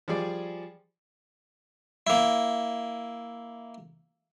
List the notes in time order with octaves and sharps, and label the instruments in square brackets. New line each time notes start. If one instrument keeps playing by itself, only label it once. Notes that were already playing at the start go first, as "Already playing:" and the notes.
[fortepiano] F3 G3 G#4 D5
[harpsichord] A#3 E4